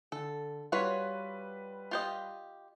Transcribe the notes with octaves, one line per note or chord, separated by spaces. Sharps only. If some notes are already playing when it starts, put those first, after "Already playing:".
D3 A4
G3 F4 F#4 B4 C#5 B6
F4 G4 D#5